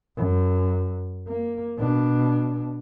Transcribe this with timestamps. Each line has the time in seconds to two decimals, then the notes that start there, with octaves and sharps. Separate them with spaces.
0.16 F#2
1.28 A#3
1.78 B2 D4